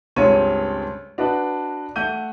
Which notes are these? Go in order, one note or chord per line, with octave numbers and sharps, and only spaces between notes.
C#2 G2 C4 C#5 D#7
D4 F#4 B4 D5 D#5
A3 F#5 G6 D#7